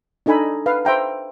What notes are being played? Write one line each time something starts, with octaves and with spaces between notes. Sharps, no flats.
D4 D#4 A4 G#5 B5
B4 F5
C5 E5 G5 A#5